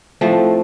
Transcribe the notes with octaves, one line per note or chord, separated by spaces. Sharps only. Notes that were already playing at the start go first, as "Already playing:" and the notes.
A2 F3 A3 C4